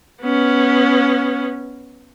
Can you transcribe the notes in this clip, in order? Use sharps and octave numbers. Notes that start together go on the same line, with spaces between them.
B3 C#4